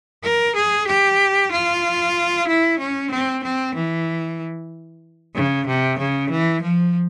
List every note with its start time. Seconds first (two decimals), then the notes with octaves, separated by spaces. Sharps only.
0.24 A#4
0.56 G#4
0.87 G4
1.52 F4
2.48 E4
2.79 C#4
3.11 C4
3.44 C4
3.75 E3
5.35 C#3
5.67 C3
5.99 C#3
6.30 E3
6.62 F3